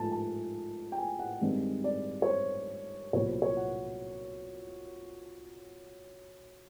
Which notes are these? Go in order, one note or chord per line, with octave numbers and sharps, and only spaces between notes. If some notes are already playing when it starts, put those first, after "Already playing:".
Already playing: G#2 F3 A3 G#5 A5
A5
G5
G#5
F#5
G2 D#3 G#3 C4
D5
C#5
C5
C2 A#2 F#3 B3 C#5
C5
C#5
F#5